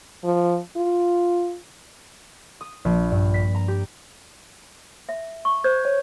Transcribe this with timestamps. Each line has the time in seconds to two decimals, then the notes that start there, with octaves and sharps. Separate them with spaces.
0.24 F3
0.77 F4
2.61 D#6
2.85 A#1
3.11 G2
3.34 B6
3.55 A#5
3.68 G4
5.09 E5
5.45 C#6
5.64 C5 G6 G#6
5.85 C#5